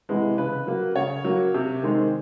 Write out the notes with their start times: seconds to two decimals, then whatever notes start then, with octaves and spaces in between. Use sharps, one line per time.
0.09 C3 E3 G#3 B3
0.38 C#3 B4
0.67 F#3 A#3
0.96 C#3 C#5
1.24 F#3 A#3
1.54 C3
1.83 D#3 G#3 C4